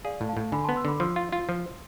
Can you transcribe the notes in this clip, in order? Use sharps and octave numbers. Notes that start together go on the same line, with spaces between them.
G#4 D5 F5
A2
F5 A5
A2
D3 G#5 B5
B3 A5 C6
C6 E6
D3 B5 D6
F3 C6 E6
F4
F4
F3